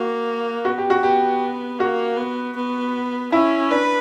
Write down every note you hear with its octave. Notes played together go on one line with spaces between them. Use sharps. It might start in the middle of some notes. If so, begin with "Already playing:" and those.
Already playing: A#3 F#4
B3 F#4
G4
F#4
B3 G4
A#3 F#4
B3
B3
C#4 E4
D4 B4